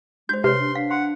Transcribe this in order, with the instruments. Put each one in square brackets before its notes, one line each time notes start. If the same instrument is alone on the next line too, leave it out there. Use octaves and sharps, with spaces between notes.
[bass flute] G#3 [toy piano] F#4 C5 [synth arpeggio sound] G6
[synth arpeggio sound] C3 [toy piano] B4 C#5 [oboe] C6
[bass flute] D4
[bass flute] D4 [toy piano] F5
[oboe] F#5 [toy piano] C6